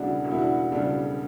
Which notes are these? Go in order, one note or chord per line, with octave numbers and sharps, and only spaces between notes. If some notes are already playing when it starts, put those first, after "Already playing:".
Already playing: E1 D2 C#3 G3 D4 E4 F#4
E1 F#4
E4
D4 F#4
D2 C#3 G3 D4